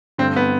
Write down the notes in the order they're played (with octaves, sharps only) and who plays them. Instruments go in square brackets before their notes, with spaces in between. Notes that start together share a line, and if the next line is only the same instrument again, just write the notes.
[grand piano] G2 D3 A3 [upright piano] C4
[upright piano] B3